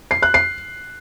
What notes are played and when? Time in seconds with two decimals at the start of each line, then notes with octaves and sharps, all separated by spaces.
0.11 C7
0.22 F#6
0.34 C7